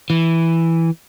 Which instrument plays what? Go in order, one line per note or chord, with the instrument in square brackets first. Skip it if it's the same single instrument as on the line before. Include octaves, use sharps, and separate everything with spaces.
[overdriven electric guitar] E3